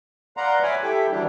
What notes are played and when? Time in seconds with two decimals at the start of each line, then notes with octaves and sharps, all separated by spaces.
0.37 B4 D5 F5 F#5 A#5 C6
0.63 C#5 E5 F#5 G#5 B5 D6
0.83 E4 G4 A4 E5 G5
1.11 D#3 E3 F#3 G3 D4 E4